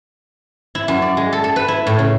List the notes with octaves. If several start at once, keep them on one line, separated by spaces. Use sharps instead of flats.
E4
F#2
D5
G#3
A4
A4
B4
E4
A2
C#3